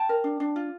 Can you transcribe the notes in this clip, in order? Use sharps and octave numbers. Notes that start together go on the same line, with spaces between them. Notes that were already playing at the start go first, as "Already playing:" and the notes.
Already playing: G5 A5
A#4
D4
D4
F4